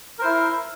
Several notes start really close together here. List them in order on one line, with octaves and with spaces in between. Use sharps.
A#4 C5 E4